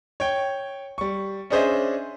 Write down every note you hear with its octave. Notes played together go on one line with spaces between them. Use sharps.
C#5 G5
G3 C#6
C#4 D4 G#4 C5 D#5 E5